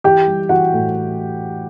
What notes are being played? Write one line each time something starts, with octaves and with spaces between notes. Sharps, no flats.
E3 G4 G5
G3
E3 F#4 F#5
A2